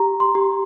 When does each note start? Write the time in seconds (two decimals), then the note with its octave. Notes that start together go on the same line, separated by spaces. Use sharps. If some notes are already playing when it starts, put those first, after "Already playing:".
Already playing: G4 A#5
0.20 C6
0.35 G4